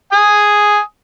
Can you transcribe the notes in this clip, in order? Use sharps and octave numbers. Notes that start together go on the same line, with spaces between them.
G#5 D#6